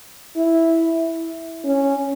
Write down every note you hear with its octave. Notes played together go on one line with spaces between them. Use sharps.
E4
C#4